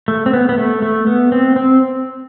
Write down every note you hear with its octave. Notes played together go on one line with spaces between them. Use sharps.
A3
C4
B3
B3
A3
A3
B3
C4
C4